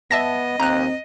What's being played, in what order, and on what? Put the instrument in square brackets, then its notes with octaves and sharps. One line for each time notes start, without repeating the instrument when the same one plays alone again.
[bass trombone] B3 [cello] D#5 [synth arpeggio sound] E5 A5 A#6
[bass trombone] D#2 [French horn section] C4 [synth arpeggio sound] A#5 F#6